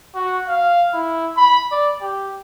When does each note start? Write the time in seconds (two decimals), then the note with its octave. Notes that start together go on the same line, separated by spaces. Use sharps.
0.15 F#4
0.48 F5
0.94 E4
1.37 B5
1.72 D5
2.02 G4